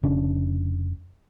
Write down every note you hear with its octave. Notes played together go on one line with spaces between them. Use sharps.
F1 C#3 C#4 D4